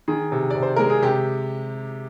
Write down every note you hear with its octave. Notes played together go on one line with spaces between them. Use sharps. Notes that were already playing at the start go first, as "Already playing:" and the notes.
D#3 G#4
C3
C3 D5
C5
G#3 A#4
G#4
C3 G4